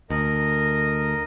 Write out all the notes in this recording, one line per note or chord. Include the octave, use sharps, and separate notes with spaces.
D2 A#4 D#5